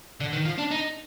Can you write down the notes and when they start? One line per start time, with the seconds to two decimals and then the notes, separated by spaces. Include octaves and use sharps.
0.20 D3
0.33 D#3
0.45 F3
0.58 D4
0.71 D#4